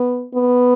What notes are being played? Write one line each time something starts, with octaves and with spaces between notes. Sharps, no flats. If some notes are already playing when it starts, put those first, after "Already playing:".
Already playing: B3
B3